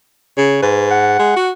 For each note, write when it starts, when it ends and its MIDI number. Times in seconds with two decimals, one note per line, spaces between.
0.37 0.60 49
0.37 0.58 73
0.62 1.18 44
0.62 0.86 71
0.91 1.50 78
1.19 1.35 56
1.36 1.51 66